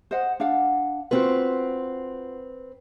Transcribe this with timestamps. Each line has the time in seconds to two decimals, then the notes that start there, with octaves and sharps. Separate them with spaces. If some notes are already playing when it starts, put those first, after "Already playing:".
0.11 C5 D#5 F#5
0.40 D4 F5 F#5
1.11 C4 F4 F#4 B4